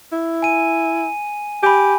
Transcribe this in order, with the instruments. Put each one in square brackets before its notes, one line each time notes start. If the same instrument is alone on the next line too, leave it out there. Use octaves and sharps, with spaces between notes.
[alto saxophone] E4
[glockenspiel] G#5 D#7
[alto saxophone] G4 [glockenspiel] G#5 B5